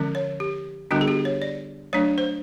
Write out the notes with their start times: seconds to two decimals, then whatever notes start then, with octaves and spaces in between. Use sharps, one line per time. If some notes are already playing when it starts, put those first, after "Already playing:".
Already playing: D3 F3 G#3 C#4
0.15 C#5
0.40 G4
0.91 D3 G3 B3 D4 F#4
1.01 G#4
1.08 G4
1.25 C#5
1.42 D5
1.93 F#3 A3 D4 C#5
2.18 C5